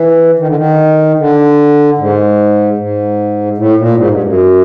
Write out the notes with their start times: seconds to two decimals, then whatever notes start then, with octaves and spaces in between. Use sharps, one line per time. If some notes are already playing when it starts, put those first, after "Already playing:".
Already playing: E3
0.39 D#3
0.47 D3
0.56 D#3
1.19 D3
1.98 G#2
2.77 G#2
3.58 A2
3.77 A#2
3.97 G#2
4.10 G2
4.23 F#2